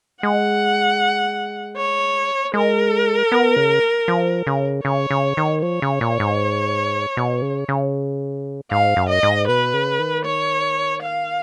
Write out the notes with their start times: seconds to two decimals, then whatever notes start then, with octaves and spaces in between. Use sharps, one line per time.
0.23 G#3 F#5
1.77 C#5
2.54 G#3 A#4
3.32 B3
3.56 C#3
4.08 F3
4.47 C#3
4.85 C#3 C#5
5.11 C#3
5.37 D#3
5.62 F3 C#5
5.82 C#3
6.01 A#2
6.20 G#2
7.17 B2
7.42 C#3
7.69 C#3
8.71 G#2 F5
8.96 F#2
9.09 D#5
9.23 G#2
9.48 B2 B4
9.74 C#3
9.99 D#3
10.25 C#5
11.02 F5